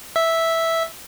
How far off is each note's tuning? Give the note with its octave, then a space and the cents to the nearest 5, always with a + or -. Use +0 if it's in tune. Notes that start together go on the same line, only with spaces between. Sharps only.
E5 -5